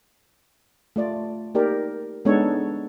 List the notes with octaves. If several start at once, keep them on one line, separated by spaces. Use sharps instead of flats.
A3 F4 D5
A#3 D#4 G4 A#4 D5
G#3 B3 D4 D#4 A4 C#5